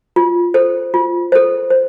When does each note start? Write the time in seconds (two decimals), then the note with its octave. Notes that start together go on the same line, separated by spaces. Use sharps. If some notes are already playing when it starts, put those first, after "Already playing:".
0.16 F4
0.54 A4 C5
0.94 F4
1.32 A4 C5
1.70 C5